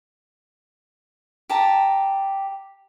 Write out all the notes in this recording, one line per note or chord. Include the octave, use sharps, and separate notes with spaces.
G4 A5 A#5